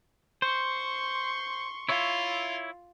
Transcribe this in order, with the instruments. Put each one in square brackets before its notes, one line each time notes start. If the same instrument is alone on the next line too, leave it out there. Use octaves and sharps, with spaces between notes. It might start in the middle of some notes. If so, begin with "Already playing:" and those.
[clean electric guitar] C5 [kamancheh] C6 C#6
[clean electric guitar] E4 C#5 E5 [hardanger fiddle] F4